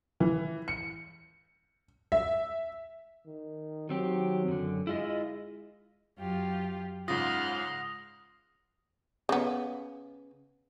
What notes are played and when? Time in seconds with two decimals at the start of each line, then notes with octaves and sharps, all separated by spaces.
0.20 E3
0.68 C#7
2.12 E5
3.26 D#3
3.89 D#3 F#3 C4 G4
4.48 F#2 D3
4.87 G#3 E4 F4 D#5
6.18 F#2 F4 G4
7.08 G#2 C#3 F4 F#5 C6 D#6 F6 A#6
9.29 C#3 B3